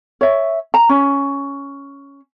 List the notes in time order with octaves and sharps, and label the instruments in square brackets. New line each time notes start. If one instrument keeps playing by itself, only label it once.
[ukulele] C#5 E5
A#5
C#4